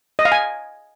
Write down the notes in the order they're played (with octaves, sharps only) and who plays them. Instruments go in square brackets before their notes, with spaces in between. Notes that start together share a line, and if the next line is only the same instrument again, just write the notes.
[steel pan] D#5
F5
G#5